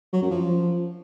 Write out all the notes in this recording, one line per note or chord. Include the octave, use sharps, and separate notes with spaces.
F#3
F#2
F3